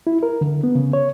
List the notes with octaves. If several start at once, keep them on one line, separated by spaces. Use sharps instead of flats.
E4
A#4
D3
B3
C#3
C#5